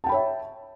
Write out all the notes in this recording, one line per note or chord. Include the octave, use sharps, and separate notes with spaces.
C#5 E5 G5 A5 B5